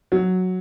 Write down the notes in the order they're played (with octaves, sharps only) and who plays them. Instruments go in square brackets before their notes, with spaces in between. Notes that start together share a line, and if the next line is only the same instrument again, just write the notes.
[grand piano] F#3